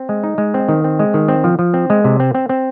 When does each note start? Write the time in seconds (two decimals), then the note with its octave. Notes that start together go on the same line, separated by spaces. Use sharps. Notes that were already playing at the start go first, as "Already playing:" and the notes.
Already playing: C4
0.09 G#3
0.24 D#4
0.38 G#3
0.54 C4
0.68 D#3
0.84 C4
0.99 G#3
1.14 D#3
1.28 C4
1.44 F3
1.59 F3
1.74 C4
1.90 G#3
2.04 C3
2.20 C4
2.35 C4
2.49 C4